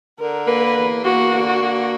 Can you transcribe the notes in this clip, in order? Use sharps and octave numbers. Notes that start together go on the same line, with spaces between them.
D3 A#4
A#3 B4
E2
A#3 F#4
D3
F#4
A#3